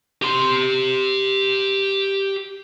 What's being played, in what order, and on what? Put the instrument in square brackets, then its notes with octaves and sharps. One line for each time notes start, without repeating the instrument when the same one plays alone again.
[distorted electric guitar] G4 C6